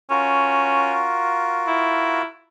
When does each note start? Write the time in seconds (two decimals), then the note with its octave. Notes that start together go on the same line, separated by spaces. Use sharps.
0.10 C#4 F4 F#4 A#4
1.67 E4